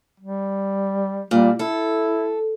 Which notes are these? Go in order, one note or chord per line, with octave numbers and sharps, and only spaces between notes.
G3
A#2 G3
E4 A4